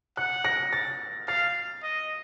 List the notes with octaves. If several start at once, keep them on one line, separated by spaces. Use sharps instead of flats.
F#5 F#6
A#6
A6
F5 A6
D#5